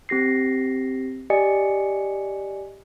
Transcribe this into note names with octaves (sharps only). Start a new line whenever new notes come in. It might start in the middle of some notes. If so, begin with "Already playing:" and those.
C4 G4 A#6 C7
G4 D5 D#5 G#5 C#7